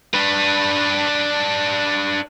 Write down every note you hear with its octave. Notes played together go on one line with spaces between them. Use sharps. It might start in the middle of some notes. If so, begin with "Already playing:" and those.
D4 B4